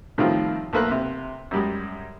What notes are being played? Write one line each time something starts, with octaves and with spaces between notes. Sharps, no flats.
A2 D#3 F3 G3 C4 F4
B1 A3 A#3 B4 F#6
C3
F#2 G3 G#3